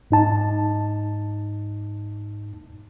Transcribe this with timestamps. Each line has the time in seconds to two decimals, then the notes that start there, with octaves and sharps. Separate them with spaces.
0.11 G#2 D#4 A5